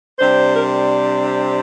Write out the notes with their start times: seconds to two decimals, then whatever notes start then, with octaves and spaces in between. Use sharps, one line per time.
0.19 C3 G3 D4 C5
0.56 A#4
0.63 C5